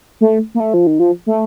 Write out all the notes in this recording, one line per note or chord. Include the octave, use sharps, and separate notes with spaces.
A3
A#3
A3
F3
D#3
F3
A3